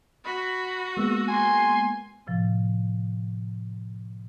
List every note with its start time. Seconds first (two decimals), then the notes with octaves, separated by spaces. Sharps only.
0.25 F#4 B5
0.97 G#3 A#3 B3 E6
1.28 G#5 C6
2.27 A2 C3 F3